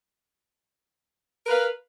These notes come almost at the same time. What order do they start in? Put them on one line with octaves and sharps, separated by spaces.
A#4 B4 F5